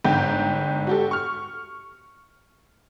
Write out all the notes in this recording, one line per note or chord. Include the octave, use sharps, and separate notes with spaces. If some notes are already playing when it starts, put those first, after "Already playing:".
G1 G#2 G5 G6
F#4 G4 A4
C#6 F6